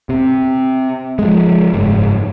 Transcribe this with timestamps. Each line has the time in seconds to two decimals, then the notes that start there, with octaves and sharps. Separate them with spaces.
0.09 C3
1.19 F3 G#3
1.73 F#1 G#2